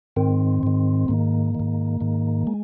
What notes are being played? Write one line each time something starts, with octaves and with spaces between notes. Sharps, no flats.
G#2 D#3 C4
G#2 D#3
G#2 D#3 A#3
D#3
G#2
G#2 D#3
G#3